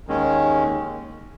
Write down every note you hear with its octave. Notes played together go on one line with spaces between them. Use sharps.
D#2 D#3 G#3 C#4